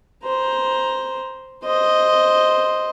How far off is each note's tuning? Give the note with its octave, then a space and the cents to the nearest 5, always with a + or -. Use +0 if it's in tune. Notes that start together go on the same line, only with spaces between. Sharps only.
C5 +0 A#5 +15
C5 +0 D#5 +0